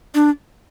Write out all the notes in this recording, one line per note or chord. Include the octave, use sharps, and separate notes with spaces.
D4